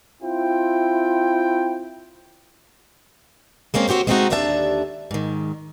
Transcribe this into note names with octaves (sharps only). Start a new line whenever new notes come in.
C4 E4 F4 G5
G#3 A#3 C4 C#4
C4 F#4 G4 C5 C#5
G#3 A3 C4 C#4 D#4 F#4
D#2 D3 D4 E5 F#5 A5
G#2 D#3